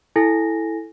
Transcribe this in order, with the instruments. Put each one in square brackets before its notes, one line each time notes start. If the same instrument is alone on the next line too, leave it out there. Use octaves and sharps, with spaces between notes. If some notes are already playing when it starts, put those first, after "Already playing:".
[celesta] E4 A4 G#5 A#6